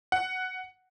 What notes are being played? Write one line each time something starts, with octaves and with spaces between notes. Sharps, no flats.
F#5